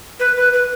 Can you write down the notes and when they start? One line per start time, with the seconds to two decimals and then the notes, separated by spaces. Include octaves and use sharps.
0.19 B4
0.36 B4
0.53 B4